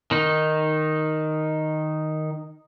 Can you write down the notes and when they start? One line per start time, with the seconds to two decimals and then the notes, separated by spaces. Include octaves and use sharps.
0.11 D#3 D#4